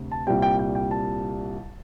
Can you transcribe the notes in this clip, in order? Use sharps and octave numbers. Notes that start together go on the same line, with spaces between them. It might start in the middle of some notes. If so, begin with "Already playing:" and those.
Already playing: D2 C3
A5
C2 A#2 G3 C4 G5
G5
G5
G5
A5